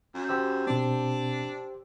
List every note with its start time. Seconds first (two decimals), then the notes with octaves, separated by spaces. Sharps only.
0.14 F#2
0.29 G4 C5 E6
0.67 B2 C4 D4